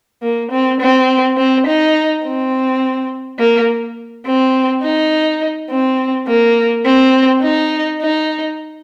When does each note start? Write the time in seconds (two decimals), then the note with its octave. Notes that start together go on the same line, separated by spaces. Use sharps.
0.23 A#3
0.51 C4
0.81 C4
1.37 C4
1.67 D#4
2.25 C4
3.39 A#3
4.26 C4
4.84 D#4
5.71 C4
6.27 A#3
6.85 C4
7.42 D#4
8.01 D#4